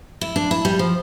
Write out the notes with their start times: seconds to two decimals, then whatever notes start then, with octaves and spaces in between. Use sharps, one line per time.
0.21 E4
0.36 D4
0.51 E4
0.65 G3
0.79 F3